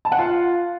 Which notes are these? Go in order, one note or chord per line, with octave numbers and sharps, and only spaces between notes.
A5
F#5
F4